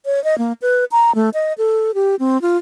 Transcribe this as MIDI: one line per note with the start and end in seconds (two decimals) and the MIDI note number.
0.06 0.22 73
0.24 0.37 75
0.38 0.53 58
0.62 0.85 71
0.92 1.14 82
1.15 1.30 57
1.34 1.53 75
1.58 1.94 69
1.94 2.15 67
2.19 2.40 60
2.42 2.57 65